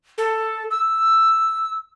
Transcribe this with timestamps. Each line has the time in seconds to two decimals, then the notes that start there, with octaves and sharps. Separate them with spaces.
0.18 A4
0.71 E6